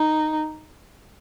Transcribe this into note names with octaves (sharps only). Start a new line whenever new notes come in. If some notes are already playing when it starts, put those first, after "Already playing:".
Already playing: D#4